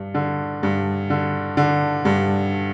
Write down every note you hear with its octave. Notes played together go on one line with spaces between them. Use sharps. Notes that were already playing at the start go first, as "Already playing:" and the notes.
Already playing: G2
D3
G2
D3
D3
G2